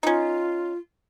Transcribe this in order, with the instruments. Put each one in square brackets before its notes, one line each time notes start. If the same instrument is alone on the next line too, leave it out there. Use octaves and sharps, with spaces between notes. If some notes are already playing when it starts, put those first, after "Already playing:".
[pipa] C#4 D#4 [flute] F4